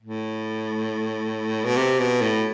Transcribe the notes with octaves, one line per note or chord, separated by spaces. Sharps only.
A2
B2
C3
B2
A2